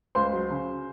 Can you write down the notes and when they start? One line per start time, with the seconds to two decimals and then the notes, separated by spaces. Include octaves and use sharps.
0.15 C#2 C5 C6
0.33 F#3
0.51 C#3